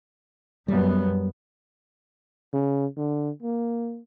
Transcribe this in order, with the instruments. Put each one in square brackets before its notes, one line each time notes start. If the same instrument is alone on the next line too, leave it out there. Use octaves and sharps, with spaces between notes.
[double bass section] F#2 B3 [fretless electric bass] G3
[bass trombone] C#3
D3
A#3